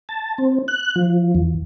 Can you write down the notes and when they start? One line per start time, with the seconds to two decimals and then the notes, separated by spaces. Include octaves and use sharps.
0.09 A5
0.38 C4
0.68 F#6
0.96 F3
1.35 E2